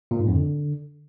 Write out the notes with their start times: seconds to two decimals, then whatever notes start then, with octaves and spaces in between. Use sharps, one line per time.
0.11 A#2
0.19 G#2
0.28 F2
0.36 D3